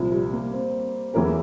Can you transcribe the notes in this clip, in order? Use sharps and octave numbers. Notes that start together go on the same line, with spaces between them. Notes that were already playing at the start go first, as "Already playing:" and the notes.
Already playing: C2 A#2 F3
G3
A#3
C4
E2 E3 A#3 C#4 E4 A#4